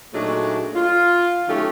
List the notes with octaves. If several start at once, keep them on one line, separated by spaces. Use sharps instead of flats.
A#2 F#3 A3 D4 D#4 G#4
F4
D#3 F#3 A3 C#4 G4 C#5